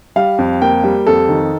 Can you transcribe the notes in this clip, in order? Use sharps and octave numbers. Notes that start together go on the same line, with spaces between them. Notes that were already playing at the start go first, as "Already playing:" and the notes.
G3 F5
F2
A#3 G5
G3
F2 A4
D#3